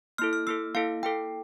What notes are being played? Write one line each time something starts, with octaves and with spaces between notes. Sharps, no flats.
A#3 E4 A4 F6
F6
A#3 E4 A4 E6
A#3 E4 A4 F5
A#3 E4 A4 G5